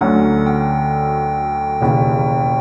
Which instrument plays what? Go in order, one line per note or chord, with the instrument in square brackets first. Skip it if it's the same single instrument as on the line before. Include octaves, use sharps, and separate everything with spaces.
[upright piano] D2 D3 F#3 A3 C#4 [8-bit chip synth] F#5
[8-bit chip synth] G5
[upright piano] E1 D#2 C#3